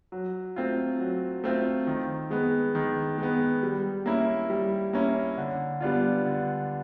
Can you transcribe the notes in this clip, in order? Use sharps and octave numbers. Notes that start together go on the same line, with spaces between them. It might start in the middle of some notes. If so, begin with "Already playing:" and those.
F#3
A3 C4 F4
F#3
A3 C4 F4
D#3
G#3 B3
D#3
G#3 B3
G3
A#3 C#4 E4
G3
A#3 C#4 E4
D3
G3 B3 D4 F4
D3